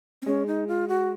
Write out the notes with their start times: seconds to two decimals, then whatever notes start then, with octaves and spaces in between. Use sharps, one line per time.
0.22 C4
0.26 G#3 C#4
0.47 D#4
0.68 F4
0.88 F#4